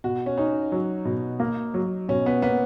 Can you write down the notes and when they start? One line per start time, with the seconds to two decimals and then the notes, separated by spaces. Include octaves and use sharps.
0.04 B2 F#4
0.26 C#4
0.38 C#4 D#4
0.72 F#3
1.05 B2
1.40 A#3
1.74 F#3
2.08 B2 C#4
2.26 B3
2.42 A#3 B3